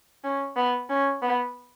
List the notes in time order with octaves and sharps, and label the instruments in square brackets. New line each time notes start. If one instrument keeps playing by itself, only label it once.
[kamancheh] C#4
B3
C#4
B3